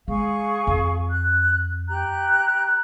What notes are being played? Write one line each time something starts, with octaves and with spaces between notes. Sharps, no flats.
G#3 G#4 F5 C#6
F2
F#6
G4 A#5 F#6